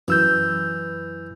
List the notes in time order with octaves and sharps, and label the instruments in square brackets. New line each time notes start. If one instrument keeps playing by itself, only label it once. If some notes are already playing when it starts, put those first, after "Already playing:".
[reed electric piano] F#2 E6 G6 [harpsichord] E3